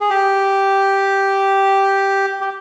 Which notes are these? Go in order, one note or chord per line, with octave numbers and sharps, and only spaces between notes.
G#4
G4
G4